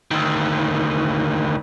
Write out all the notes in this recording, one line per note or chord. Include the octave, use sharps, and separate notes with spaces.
D2 D#3